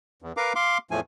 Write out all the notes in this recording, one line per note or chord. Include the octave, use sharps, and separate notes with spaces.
E2
A#4 B4 F5 A#5 D6
F5 C6 D6
E2 A2 F3 A3 G#5